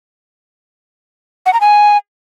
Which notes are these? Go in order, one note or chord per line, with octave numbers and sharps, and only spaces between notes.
F#5
A#5
G#5